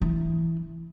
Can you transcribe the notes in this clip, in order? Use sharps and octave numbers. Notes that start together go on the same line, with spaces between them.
E3